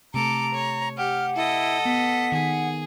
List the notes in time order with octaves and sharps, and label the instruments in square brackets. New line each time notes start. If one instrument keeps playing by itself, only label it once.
[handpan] C3 A3 [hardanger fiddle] A4 D6 [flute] A#5
[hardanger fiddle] C#5
[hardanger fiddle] G4 [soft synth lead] F#5 [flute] F6
[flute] E4 [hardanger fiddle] A4 D#5
[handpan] B3 [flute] B6
[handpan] D#3 [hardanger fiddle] G#4